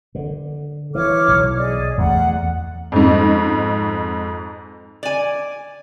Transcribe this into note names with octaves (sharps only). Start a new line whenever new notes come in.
D3
E3 C#5 D6 F6
B1
G#4 D5 D#5
E2 A3 F#5
F2 G#2
D5 G#5